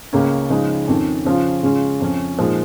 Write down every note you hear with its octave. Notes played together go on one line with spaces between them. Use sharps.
C#2 C#3 A#3 C#4
C#3 F3 G#3 D#4
F2 D#3 C#4
C#3 F3 C#4 F4
C#3 G#3 C#4 F4
F2 F3 C#4
A#2 F3 G#3 D#4